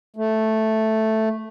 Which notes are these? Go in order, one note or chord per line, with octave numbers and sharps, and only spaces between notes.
A3